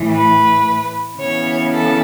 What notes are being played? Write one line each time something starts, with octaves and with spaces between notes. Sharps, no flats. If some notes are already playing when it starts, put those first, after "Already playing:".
Already playing: A2 E3 A3
B4
C#3 E3 B3 C#5
A4